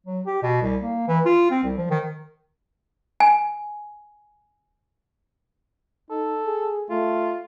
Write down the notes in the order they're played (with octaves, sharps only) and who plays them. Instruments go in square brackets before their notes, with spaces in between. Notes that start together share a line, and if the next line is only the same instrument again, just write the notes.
[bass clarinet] F#3
G4
B2
C2
A#3
E3
F4
C4
C2
F3
D#3
[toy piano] G#5
[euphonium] D#4 [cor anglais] A4
[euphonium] G#4
[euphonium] A3 [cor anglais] F4